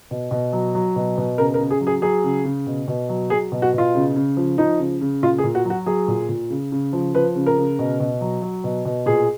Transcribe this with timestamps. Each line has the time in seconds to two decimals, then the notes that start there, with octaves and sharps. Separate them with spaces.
0.11 B2
0.31 B2
0.53 F#3
0.75 F#3
0.96 B2
1.18 B2
1.38 C#3 A#4
1.54 A#4
1.60 C#3
1.71 G#4
1.81 F#3
1.87 G#4
2.02 F#3 G#4
2.24 C#3
2.45 C#3
2.66 B2
2.88 B2
3.09 F#3
3.30 F#3 G#4
3.52 B2
3.62 F#4
3.74 B2 F4
3.95 C#3
4.16 C#3
4.37 F3
4.58 F3 D#4
4.79 C#3
5.01 C#3
5.23 A#2 F4
5.38 G#4
5.44 A#2
5.55 F#4
5.65 F#3 F#4
5.86 F#3 G#4
6.08 A#2
6.29 A#2
6.50 C#3
6.72 C#3
6.93 F3
7.15 F3 B4
7.36 C#3
7.46 A#4
7.57 C#3
7.79 B2
8.00 B2
8.21 F#3
8.42 F#3
8.64 B2
8.85 B2
9.06 A#2 G#4